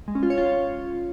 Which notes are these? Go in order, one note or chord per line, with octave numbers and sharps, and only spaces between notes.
G#3
C#4
F4
C#5
F4